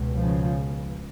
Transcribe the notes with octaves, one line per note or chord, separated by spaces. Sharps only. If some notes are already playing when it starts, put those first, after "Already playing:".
Already playing: C#2 B2
C#3 F3